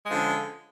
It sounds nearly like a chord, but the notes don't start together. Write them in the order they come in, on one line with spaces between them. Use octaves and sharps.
G#3 F3 D3 C#4